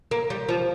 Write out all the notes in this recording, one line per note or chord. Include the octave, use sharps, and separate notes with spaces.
A#3
G3
F3